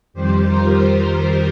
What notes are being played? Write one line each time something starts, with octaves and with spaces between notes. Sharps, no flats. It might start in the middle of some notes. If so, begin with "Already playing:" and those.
F2 D#3 G3 G4 C5
F4 A#4
G4